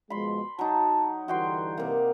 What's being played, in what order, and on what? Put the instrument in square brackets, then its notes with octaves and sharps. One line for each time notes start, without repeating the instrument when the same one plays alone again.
[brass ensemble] B2 F3 G#3 [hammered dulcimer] B5 C6
[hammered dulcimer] F#3 D#4 [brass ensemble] A5
[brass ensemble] G2 D3 E3 [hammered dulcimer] F#4 G5 C6
[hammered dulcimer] C3 A#3